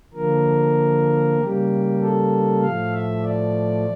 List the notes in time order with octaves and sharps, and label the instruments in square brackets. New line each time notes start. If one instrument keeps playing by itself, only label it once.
[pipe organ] D3 F3 A#3 A#4
C#3 G3 A#3 G4
A4
A2 F3 A3 F5
E5
D5